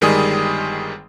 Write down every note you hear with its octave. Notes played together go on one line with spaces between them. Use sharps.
G1 D#3 G3 G#3 G#4 D#6